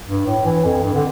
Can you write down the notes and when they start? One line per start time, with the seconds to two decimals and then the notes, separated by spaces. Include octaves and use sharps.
0.08 G2
0.27 A2
0.45 E3
0.64 F2
0.83 G2
0.94 D3